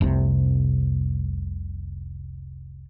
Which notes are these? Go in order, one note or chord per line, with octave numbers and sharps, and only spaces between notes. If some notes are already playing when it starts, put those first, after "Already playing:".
F1 C2 C3